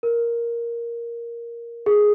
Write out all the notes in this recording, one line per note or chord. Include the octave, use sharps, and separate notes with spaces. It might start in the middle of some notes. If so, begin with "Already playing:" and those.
A#4
G#4